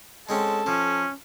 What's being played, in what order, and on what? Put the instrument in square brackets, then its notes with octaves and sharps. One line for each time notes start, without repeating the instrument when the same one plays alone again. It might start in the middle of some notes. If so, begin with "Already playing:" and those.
[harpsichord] G#3 C4 C#4 [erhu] A4
[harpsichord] F3 [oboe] C#4